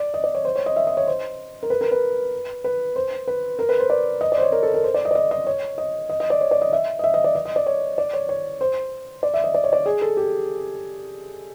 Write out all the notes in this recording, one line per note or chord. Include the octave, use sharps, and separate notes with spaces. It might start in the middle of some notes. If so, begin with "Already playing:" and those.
Already playing: D5
D#5
D5
C#5
C5
C#5
D#5
E5
D#5
C#5
C5
A#4
B4
A#4
B4
B4
C5
B4
A#4
B4
C5
D5
D#5
D5
C5
C#5
A#4
A4
A#4
C5
D5
D#5
D5
D#5
D#5
C#5
D#5
D#5
D#5
D5
C#5
D5
D#5
E5
D#5
E5
D#5
D5
D#5
D#5
D5
C#5
D5
C#5
C#5
C5
D5
E5
D#5
D5
C#5
D5
G#4
A4
G4